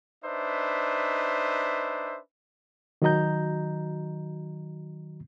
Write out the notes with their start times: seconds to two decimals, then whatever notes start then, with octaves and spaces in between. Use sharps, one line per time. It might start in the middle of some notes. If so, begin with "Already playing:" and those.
0.24 D4 D#4 B4 C5 E5
3.02 D#3 F#3 F#4 D#5 A#5 G6